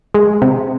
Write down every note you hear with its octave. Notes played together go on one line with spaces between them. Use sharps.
G#3
C3